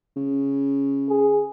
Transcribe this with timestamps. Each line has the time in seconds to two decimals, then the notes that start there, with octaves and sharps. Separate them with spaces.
0.16 C#3
1.09 G#4